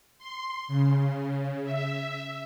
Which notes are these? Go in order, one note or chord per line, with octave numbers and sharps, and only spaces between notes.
C6
C#3
E5